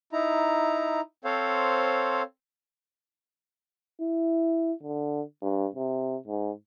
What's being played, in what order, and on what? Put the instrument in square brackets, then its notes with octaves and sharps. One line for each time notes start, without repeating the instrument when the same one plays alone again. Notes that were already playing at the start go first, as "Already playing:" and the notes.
[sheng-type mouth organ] D#4 E4 A#5
C4 A4 C5 C#5 F5
[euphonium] E4
D3
G2
C3
G#2